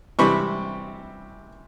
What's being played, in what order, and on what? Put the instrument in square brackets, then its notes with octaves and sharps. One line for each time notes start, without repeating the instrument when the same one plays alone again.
[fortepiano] C3 E3 G3 B5 C#6